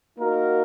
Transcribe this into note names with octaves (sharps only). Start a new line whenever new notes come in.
A#3 D#4 F#4 A#4